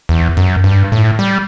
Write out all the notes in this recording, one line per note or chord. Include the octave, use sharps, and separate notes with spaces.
E2
F#2
G2
A2
G3